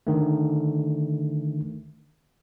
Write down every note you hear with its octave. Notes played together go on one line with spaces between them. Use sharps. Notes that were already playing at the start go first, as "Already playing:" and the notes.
D3 D#3 A3